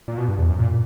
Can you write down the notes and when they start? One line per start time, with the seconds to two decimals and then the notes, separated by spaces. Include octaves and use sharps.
0.08 A#2
0.17 B2
0.28 G2
0.38 E2
0.48 F#2
0.59 A#2